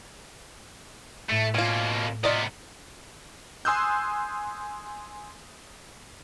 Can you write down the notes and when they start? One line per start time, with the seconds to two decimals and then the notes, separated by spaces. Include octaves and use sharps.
1.29 A2 A3 C#7
1.54 B2 A#3 C#4 F4
2.24 C3 B3 F4 D5 D#5
3.65 G#5 C6 D#6 E6 F#6 G6